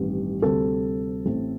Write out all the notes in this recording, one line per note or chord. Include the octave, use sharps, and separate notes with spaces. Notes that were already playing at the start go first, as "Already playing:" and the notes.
Already playing: A1 G2 D#3 G3 C4
D2 C3 G3 C4 A4
A1 A2 A3 C4